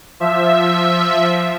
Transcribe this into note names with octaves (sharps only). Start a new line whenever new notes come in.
F3 E5